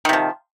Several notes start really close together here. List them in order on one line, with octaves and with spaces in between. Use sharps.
D#3 C3 F3